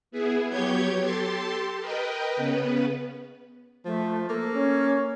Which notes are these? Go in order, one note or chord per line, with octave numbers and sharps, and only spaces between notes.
B3 E4 G#4
F#3 B3 G4 C#5 G6 G#6
G4 A4 A5 C6
A#4 B4 D#5 G5
C#3 B3 B4
F3 A3
A#3 A4
C#4